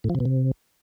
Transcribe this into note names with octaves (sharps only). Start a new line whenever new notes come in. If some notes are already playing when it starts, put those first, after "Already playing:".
A2
F3
C3
B2
C3